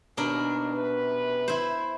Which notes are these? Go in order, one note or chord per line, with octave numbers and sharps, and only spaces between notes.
D#2 B2 D4 A#4
F#2 C3 B4
E4 C5